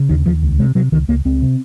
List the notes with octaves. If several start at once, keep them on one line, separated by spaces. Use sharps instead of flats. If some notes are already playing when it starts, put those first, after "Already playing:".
Already playing: C#3
D#2 D#3
D#2 F3
C#2
C3 G#3
C3 F#3
C#2 D#3
C#2 A#3
C#2 C4
C3